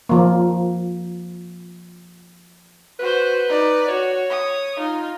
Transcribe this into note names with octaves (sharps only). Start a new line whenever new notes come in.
F3 A#3
F#4 B4 C5
D#4 D5
F#4 C#5
D#6
D#4 F4